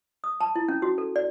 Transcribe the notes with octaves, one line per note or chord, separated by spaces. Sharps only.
D#6
A5
E4
C#4
F#4
A4
D5